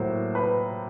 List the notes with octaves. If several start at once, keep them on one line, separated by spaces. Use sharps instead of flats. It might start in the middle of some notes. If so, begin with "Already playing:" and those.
Already playing: A2 F#3 A#3 C5
B4